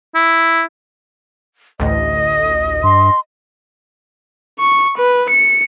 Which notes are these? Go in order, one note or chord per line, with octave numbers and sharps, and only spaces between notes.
E4
A1 D2 D#5
G2 C6
C#6
B4
C#7